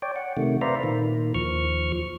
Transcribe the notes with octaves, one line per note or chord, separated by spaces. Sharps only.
C#5 D5 G5
F#5
C3 D#3 A3
B4 C5 D5 E5 F5 A#5
A#2 D#3
D#2 F3 C#6 F6